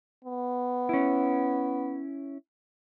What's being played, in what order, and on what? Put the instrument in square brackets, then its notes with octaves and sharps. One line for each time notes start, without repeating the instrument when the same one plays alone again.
[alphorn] B3
[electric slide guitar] C#4 E4